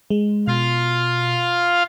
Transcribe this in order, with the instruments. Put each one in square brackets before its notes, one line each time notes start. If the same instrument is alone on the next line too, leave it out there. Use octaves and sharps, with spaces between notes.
[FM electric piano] G#3
[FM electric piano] B2 [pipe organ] F4 F5